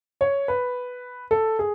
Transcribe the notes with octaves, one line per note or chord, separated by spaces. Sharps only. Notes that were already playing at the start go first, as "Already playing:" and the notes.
C#5
B4
A4
G#4